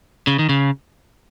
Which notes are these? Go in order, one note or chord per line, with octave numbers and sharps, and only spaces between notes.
C#3
D#3
C#3